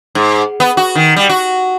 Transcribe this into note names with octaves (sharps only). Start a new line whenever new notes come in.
G#2
B3
F#4
D#3
G3
F#4